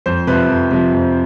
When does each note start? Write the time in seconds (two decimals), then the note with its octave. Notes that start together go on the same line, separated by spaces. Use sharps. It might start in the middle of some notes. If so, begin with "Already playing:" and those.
0.06 F2 C5
0.27 C3 F3 B4
0.49 F2
0.71 C3 F3
0.93 F2